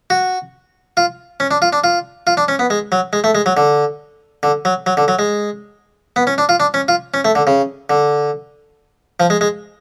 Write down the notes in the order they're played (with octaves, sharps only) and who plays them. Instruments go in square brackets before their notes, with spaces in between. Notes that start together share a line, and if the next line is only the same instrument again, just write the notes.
[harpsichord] F#4
F4
C#4
D4
F4
D4
F4
F4
D4
C#4
B3
G#3
F#3
G#3
A3
G#3
F#3
D3
D3
F#3
F#3
D3
F#3
G#3
B3
C#4
D4
F4
D4
C#4
F4
C#4
A3
D3
C#3
D3
F3
G#3
G#3